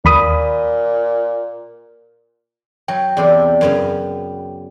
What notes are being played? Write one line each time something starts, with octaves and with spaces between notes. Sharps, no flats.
D#2 A#2 B5 D#6
F#3 G5
E2 C3 A4 D5
F#2 C#3 B3